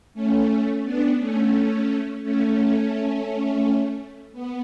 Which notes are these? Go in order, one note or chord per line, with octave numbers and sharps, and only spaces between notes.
A3 C#4
B3 D4
A3 C#4
A3 C#4
B3